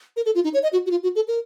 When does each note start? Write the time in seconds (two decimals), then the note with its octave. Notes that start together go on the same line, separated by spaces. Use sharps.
0.17 A#4
0.26 A4
0.35 F4
0.44 D#4
0.54 C#5
0.63 D#5
0.73 F#4
0.86 F#4
0.91 F4
1.03 F#4
1.15 A4
1.28 A#4